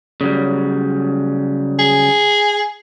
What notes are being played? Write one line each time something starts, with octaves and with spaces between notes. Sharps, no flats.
C#3 F#3 G3
G#4